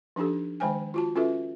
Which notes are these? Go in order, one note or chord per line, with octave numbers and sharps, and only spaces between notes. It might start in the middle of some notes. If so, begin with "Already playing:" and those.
F3 D4 D#4 G4 A4
D#3 G#3 C5 G5 G#5
F4 F#4 A5
C#4 F4 F#4 A4 B4 E5